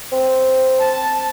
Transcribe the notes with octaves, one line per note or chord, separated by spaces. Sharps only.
C4
A5